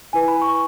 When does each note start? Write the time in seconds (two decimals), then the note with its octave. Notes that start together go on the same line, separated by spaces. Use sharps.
0.13 E4 B4 G#5
0.28 B5
0.42 C#6